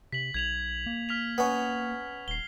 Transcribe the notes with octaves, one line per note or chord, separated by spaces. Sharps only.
C3 B6 F#7
B1 G#6 F7 F#7
A#3
F6 B6 F7
B3 C#4
D#1 C7 G7